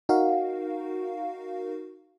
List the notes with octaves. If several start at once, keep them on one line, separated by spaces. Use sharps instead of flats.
D#4 F#4 A#4 F5